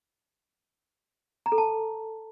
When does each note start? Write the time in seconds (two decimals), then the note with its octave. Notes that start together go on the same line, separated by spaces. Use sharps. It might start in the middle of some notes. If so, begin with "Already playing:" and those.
1.46 A#5
1.52 A4
1.58 A5